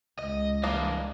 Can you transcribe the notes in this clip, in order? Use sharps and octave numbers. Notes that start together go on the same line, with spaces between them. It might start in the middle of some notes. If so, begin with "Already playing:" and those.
C#2 D#5
G2 E3 A#3 D4 D#5